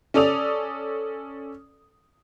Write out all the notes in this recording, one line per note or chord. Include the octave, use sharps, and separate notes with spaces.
C#4 A4 D5 D#6 F7